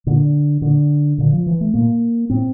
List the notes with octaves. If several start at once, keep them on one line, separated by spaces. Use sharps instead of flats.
A#2 D3
A#2 D3
A#2 D3
F3
E3
A3
A#2 A#3
A2 C4